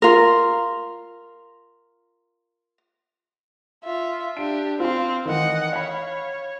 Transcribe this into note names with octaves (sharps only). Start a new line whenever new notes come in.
F4 A#4
F4 E5
D4 G4 D7
C4 F4 F5 C6
D#3 E3 D#5 F#5
C#5 F5 B5